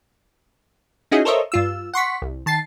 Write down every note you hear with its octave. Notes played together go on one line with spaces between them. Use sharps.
C#4 D#4 E4 F#4 G#4 D#5
A4 A#4 C5 C#5 D#5 E5
G2 F4 E6
F#5 C6 C#6 B6
C2
D#3 A5 A6 C7